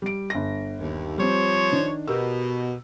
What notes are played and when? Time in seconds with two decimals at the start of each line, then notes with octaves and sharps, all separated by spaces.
0.02 G3 D7
0.30 G1 A#6
0.80 D#2
1.18 F3 G3 C4 C5 C#5
1.72 D#3 D4
2.08 B2 G4 A#4 E6